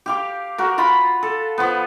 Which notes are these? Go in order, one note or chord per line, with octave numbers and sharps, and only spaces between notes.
G4 F5 D6
F#4 A#4
F4 F#5 B5
A4
F3 B3